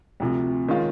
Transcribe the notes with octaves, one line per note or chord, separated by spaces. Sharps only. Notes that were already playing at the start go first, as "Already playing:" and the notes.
D2 C3 F3
D#3 G#3 C#4 F4